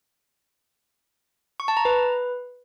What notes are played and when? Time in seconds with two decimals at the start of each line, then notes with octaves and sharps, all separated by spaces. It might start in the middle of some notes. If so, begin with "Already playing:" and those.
1.60 C#6
1.68 A5
1.77 A#5
1.85 B4